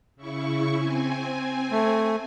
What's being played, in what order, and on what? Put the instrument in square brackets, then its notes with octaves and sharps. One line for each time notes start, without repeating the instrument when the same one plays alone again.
[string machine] C#3 E4 C#6
C4 G#5
[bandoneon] A3